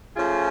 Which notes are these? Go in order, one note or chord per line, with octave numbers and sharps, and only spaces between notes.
F3 A3 C#4 F4 G#4